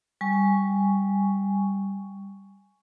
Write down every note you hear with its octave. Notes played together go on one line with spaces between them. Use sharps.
G3 G#5 C#6